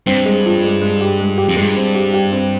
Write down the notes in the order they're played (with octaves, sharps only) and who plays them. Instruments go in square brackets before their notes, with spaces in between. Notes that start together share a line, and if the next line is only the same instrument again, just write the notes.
[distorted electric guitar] G2 [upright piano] C4
[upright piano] G#3
F3
G#3
G#3
G4
G#3
G4
[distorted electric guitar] F2
[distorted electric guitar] G2 [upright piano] G#3
[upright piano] C4
G4
G4
C4